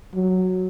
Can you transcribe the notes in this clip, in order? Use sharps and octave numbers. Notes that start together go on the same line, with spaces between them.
F#3